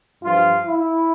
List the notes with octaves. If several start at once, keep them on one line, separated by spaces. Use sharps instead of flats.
G2 F3 F4
E4